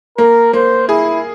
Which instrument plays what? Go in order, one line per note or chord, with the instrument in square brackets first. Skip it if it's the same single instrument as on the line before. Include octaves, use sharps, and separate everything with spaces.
[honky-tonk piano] A#3 [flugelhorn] A#4
[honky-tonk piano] A#3 [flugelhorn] C5
[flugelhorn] E4 [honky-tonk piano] G#4